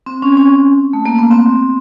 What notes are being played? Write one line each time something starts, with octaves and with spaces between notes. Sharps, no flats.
C4
C#4
C#4
A3
A#3
B3
C4